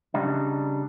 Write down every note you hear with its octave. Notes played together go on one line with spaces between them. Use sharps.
C#3 G3 D4 D#4